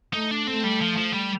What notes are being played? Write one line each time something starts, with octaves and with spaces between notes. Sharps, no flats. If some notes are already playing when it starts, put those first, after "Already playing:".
A3 D#4
D4
A3 C4
G3
F3
F3
G3